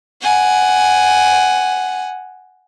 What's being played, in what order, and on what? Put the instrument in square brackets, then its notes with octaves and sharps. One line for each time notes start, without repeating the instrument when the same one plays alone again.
[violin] F#5 G#5